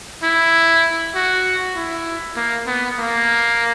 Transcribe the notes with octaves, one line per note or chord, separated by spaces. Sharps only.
E4
F#4
E4
A#3
B3
A#3